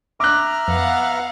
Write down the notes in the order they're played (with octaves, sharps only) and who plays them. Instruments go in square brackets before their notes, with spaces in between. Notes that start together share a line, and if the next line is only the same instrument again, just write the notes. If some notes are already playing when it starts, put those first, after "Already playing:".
[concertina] E5 A#5 F6 [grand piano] D6 F#6
[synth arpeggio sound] F2 [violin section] B3 F5 F#5